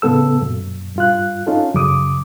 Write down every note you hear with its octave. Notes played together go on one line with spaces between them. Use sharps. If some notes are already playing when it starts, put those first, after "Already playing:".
A2 C#3 B3 A4 E6
F#2 A#2
G2 F4 F#6
C#4 D#4 F4 A4
F#2 C#3 D6 D#6